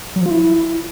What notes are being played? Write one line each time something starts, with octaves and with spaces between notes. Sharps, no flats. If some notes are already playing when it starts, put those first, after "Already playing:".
F#3
F3
F4
E4